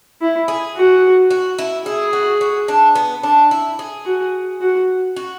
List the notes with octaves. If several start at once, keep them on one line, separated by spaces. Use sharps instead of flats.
E4
G#4
F#4
F#4
E4
E4 G#4
F#4
F#4
D4
B3
D4
E4
G#4
F#4
F#4
F#4